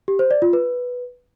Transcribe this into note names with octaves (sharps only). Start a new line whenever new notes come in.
G4
C5
D5
F4
B4